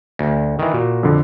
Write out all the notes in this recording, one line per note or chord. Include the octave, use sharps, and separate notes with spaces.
D2
D#3 E3
A#2 F#4
F2 D3